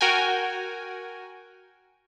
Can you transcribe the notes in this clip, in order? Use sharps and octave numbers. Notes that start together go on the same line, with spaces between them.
F#4 A#4 G5 G#5